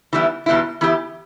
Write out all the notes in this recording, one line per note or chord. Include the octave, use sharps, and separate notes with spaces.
E3 G3 B3 E4
E2 B2 G3 B3 E4
E3 B3 E4 G4